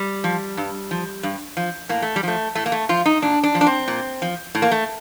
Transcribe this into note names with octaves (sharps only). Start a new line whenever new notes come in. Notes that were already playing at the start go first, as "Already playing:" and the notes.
Already playing: G3
F3
G2
F3
G2
F3
A2 A#3
A3
G3
F3 A3
A2 A3
A#3
A3
F3 F4
D#4
A#2 D4
D4
F3
D4
C4
A#2
F3
A2
A#3
A3